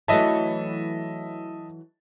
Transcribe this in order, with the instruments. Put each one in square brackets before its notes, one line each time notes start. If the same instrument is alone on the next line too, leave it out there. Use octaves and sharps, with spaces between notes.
[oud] E3 F#3 A3 [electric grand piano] D#5 E5 A5